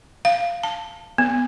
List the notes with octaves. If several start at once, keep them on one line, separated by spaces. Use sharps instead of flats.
F5
A5
B3